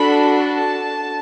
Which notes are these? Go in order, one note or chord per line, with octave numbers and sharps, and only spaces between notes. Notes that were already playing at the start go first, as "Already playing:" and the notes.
Already playing: D4 F#4 A4 B5
A5